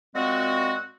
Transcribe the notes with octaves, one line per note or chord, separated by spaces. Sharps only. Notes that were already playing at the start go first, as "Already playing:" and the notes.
A#2 G#3 C4 F#4